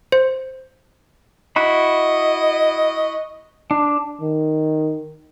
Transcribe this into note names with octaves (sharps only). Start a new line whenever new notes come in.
C5
E4 F#4 D#5 B5
D4
D#3